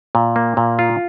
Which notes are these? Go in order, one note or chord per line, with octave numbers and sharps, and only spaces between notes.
A#2
A#3
A#2
F4